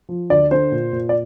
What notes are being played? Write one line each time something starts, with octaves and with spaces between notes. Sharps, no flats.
F3
D2 D5
D3 C5
A#2
A#2
D5